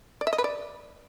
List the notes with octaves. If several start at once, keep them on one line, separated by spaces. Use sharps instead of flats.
D5
E5
D#5
B4
D5